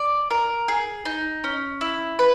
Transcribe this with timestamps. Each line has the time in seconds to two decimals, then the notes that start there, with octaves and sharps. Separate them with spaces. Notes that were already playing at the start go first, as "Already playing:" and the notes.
Already playing: D5
0.30 A#4
0.68 G#4
1.05 D#4
1.44 C#4
1.81 E4
2.19 B4